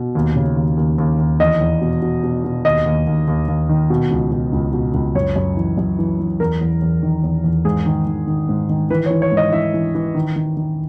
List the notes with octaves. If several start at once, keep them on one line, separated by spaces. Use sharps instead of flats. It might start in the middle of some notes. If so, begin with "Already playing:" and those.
Already playing: B2
D#2
C#3
D#2
D#2
D#2
D#2
E2 D#5
E2
B2
B2
B2
B2
D#2 D#5
D#2
D#2
D#2
D#2
D#3
B2
C#2
B2
C#2
B2
C#2
F#2 C#5
F#2
E3
F#2
E3
E3
E2 A#4
E2
E2
D#3
E2
E2
G#2 G#4
D#3
D#3
D#3
G#2
D#3
E3 B4
C#5
E3
C#5
G#2
D#5
E3 E5
E3
E3
D#3
D#3
D#3